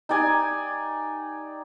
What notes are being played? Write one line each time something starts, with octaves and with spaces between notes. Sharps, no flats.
D#4 G4 D5 G#5